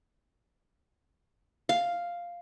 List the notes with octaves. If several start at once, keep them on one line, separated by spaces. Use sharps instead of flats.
F5